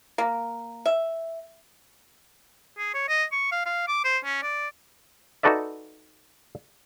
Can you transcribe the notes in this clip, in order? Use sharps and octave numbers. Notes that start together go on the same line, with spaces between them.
A#3
E5
G#4
C#5
D#5
C#6
F5
F5
D6
C5
C#4
D5
D#4 F#4 A4 B4 D5 E5